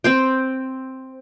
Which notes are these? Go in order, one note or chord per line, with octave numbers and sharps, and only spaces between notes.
C4 C5 G5